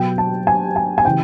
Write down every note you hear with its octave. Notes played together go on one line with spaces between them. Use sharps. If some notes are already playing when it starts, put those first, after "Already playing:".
Already playing: B2 F#3 B3 G5
A5
G#5
G#5
G#5
C#3 E3 G5